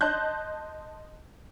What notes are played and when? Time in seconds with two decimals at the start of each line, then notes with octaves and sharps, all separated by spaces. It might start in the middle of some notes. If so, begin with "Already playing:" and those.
0.01 D#5 A5 C6 F#6 G6